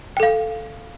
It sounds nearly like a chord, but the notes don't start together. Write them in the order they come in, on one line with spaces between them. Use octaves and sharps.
G5 A4 F5